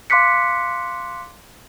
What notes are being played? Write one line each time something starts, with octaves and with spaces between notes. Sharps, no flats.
F5 C6 D6 F#6 B6 C#7